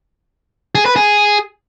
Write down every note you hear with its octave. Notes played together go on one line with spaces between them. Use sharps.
G#4
B4
G#4